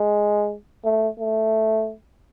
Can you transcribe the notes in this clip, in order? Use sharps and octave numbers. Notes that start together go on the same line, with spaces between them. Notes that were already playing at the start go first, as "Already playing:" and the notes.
Already playing: G#3
A3
A3